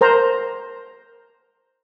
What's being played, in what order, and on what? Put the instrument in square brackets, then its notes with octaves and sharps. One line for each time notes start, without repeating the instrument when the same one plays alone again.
[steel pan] A#4 C5 A#5